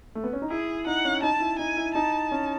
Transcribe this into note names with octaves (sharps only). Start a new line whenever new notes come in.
A3
B3
C#4
D#4
E4 G#4
D#4 F#5
C#4
D#4 A5
E4
D#4 G#5
E4
D#4 A5
C#4